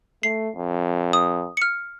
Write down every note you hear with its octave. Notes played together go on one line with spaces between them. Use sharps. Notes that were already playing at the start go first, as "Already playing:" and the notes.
A3 C7
F2
D#6
F6 C#7